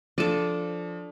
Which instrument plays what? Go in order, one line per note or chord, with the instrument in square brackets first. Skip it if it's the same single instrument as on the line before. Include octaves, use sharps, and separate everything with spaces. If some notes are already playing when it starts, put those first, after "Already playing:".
[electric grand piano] F3 D#7 [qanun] D4 A4